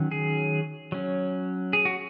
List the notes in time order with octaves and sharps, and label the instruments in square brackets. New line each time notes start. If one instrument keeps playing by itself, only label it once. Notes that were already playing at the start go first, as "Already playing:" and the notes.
Already playing: [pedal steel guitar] D#3 F#3 C#4
G#4
F#3 C#4
G#4
F#4